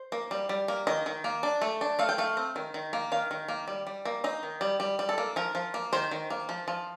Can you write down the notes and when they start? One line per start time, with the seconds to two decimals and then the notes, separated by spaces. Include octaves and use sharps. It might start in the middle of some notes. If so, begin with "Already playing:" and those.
Already playing: C5
0.12 A#3
0.31 G3
0.49 G3
0.68 A#3
0.87 D#3 D#5
1.06 D#3
1.24 A#3
1.43 D4
1.62 A3
1.81 D4
1.99 A3 F5
2.09 G5
2.18 A3 F5
2.37 C4
2.56 D#3
2.74 D#3
2.93 A#3
3.12 D#3 F5
3.31 D#3
3.48 A#3
3.68 G3
3.87 G3
4.05 A#3
4.24 D#4 D#5
4.43 D#3
4.61 G3
4.80 G3
4.99 G3
5.09 A4
5.18 A#3
5.36 F3 A#4
5.55 F3
5.74 A#3
5.93 D#3 C5
6.11 D#3
6.30 A#3
6.49 F3
6.68 F3